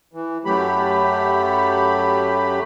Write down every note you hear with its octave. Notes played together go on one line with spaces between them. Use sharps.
E3
F#2 F#3 A3 G4 B5